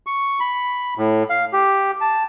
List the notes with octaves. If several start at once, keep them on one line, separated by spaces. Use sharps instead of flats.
C#6
B5
A2
F5
G4
A5